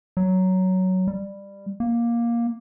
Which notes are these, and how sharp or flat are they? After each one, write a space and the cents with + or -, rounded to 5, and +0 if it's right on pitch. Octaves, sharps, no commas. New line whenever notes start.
F#3 +10
G3 +15
A#3 +10